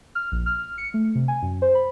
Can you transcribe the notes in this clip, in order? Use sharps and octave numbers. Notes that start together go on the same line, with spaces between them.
F6
A#1
F6
C#7
A3
C3
G#5
F#2
C5
B5